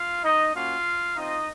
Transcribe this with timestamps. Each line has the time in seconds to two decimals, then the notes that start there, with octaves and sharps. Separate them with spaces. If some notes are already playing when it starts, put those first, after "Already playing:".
Already playing: F4 F5
0.23 D#4 D#5
0.54 A#3 C#4 F4 F#4 F5
1.16 C4 D#4 F4 D#5